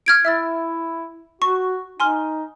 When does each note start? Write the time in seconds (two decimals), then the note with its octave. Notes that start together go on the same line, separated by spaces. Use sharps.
0.06 F6 G#6 D7
0.25 E4 E5 E6 A6
1.42 F#4 C#6
2.00 D#4 G#5 C6 F6